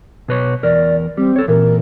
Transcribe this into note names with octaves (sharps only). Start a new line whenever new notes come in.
B2 B4 C#5
E2 A#4 D5
G3 C4
A4 C#5
A#2 E3 A#4